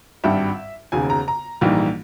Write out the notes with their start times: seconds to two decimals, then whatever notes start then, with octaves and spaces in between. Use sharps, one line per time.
0.24 G#1 G2 G3 E5
0.92 E1 D#2 C#3 G#5
1.10 A#5
1.28 A#5
1.61 A#1 G#2 E3 G3 A#3